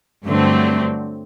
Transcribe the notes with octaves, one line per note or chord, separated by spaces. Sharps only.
G2 D3 F#3 A3 C4